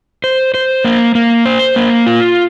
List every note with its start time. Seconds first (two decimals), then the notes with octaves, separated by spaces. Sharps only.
0.24 C5
0.54 C5
0.85 A#3
1.15 A#3
1.46 C5
1.76 A#3
2.06 F4